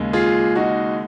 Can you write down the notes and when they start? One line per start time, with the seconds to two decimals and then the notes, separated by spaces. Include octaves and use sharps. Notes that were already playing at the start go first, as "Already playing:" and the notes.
Already playing: D#2 C#3 G#3
0.13 F4 G#4
0.55 D#4 F#4